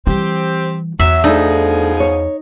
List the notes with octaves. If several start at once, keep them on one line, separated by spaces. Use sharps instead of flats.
E3 G3 C4 G4
E2 F#3 E5
B2 F3 A3 D4 D#4 G#4
C#5